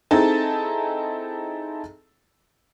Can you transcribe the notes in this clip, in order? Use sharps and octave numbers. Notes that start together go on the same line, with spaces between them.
C4 D#4 E4 G#4 A4 A5